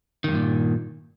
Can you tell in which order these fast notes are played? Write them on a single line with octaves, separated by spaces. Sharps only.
D#3 E2 G2 A#2